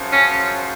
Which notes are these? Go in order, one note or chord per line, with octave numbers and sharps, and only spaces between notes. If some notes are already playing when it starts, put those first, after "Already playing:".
Already playing: F#2 C#3 F3
C#4